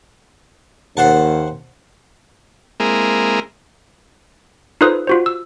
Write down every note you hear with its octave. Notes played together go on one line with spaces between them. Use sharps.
D#2 C5 F#5 A5
G#3 A#3 C4 E4 G#4 A#4
D#4 F4 A4 B4 C5 D#6
F4 F#4 C5
E6